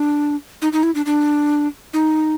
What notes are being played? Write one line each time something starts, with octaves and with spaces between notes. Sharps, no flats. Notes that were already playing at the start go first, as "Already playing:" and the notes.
Already playing: D4
D#4
D#4
E4
D4
D4
D#4